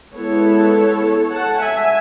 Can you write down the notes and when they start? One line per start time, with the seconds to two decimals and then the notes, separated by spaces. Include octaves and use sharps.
0.13 G#3 B3 E4 A4 C#5
1.32 F#5 A5
1.61 E5 G#5